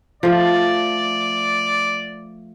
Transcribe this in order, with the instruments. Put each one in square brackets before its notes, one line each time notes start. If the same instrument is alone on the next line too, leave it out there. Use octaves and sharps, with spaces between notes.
[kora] F3 A3 [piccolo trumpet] D5